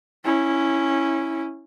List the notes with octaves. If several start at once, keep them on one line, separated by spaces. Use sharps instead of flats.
C#4 E4